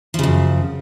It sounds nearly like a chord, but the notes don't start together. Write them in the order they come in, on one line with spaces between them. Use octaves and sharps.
F3 C#3 F#2